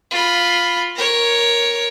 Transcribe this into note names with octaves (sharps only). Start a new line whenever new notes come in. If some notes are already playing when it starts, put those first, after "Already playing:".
F4 B5
A#4 C#5